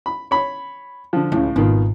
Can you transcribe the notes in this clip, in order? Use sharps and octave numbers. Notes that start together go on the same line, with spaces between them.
B5
C#5 B5
D3 F3
C#2 A2 C#3
G#1 B2 D#3 F4